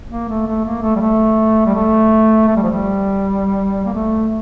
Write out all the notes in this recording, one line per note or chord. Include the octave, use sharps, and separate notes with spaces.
A#3
A3
A3
A#3
A3
G3
A3
G3
A3
A3
G3
F3
G3
A#3
A3